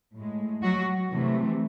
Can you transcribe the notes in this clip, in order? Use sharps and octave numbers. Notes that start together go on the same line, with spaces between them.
A2 G#3
F#3 F#4
C3 E3 A3